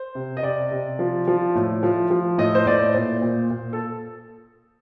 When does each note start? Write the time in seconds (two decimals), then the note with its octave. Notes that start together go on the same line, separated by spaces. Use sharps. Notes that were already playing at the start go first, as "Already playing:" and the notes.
Already playing: C5
0.15 C3
0.37 D#5
0.43 C3 D5
0.71 C3
0.99 F3
1.27 F3
1.55 A2
1.83 F3
2.10 F3
2.38 A2 D#5
2.55 C5
2.66 A2 D5
2.94 A#2 C5
3.22 A#2
3.50 A#2
3.73 A4